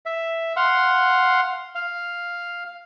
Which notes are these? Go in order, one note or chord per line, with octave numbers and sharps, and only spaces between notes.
E5
F5 F#5 C6
F5